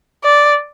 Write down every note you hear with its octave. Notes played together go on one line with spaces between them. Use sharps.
D5